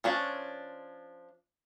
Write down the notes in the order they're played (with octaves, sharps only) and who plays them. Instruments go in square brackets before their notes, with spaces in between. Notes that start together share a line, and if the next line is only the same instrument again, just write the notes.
[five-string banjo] F3 C#4 D4